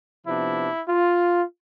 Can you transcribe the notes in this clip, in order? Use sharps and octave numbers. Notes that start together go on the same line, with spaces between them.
C3 F3 B3 D4 E4
F4